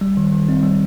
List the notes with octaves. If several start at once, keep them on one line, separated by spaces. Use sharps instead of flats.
G3
D#3
D#3
C4
G3